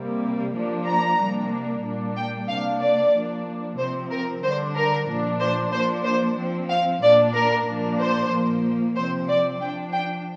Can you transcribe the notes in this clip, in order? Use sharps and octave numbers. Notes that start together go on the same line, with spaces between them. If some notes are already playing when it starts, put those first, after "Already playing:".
Already playing: C3 G3 A#3
F3 A#3 D4
A#5
C3 G3 A#3 D4
A#2 G3 A#3 D4
G5
C3 A#3 D4 F5
D5
F3 A#3 D4
C3 F3 C4 C5
A#4
D3 G3 D4 C5
A#4
A#2 F3 D4
C5
F3 A#3 D4 C5
C5
F3 C4
F5
A#2 A#3 D4 D5
A#4
A#2 F3 A#3 D4
C5
A#2 F3 A#3
C3 F3 C4 C5
D5
F3 D4 G5
G5